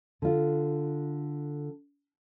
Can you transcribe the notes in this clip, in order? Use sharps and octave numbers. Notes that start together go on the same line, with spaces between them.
D3 F4